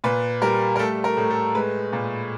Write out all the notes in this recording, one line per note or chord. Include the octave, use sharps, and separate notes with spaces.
A#2 B4
G3 A#4
A#4
A3 A4
A#4
A2
A4
G#3 B4
A#2